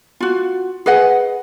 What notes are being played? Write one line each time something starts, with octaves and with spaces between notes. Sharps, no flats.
F4 F#4
G#4 B4 D#5 F#5